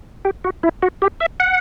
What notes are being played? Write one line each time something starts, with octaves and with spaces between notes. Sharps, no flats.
G4
F#4
E4
F#4
G4
E5
F#5